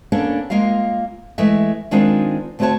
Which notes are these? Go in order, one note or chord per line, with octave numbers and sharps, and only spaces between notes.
A#3 B3 C#4 D4 A4
G#3 A#3 F4 D#5 F5
E3 G#3 A3 D#5 E5
D#3 G#3 C4 D4 D#4 F4
D2 A3 C4 F#4 C#5 A5